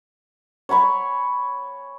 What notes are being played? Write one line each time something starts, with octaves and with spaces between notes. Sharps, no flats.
C#5 G#5 B5 C#6